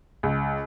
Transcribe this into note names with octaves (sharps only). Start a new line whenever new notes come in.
C#2